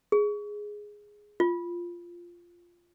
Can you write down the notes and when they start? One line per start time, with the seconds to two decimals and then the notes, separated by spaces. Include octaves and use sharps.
0.12 G#4
1.40 F4